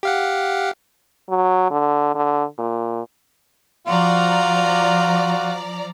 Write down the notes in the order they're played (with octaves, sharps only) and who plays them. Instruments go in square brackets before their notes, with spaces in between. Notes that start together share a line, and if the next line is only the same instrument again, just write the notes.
[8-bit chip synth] G4 F5 F#5
[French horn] F#3
D3
D3
A#2
[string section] F3 D5 A#5 [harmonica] F4 F#4